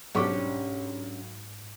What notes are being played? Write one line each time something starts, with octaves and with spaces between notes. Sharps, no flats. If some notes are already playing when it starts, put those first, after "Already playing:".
B1 G#2 C#4 D4 G4 C#6 D6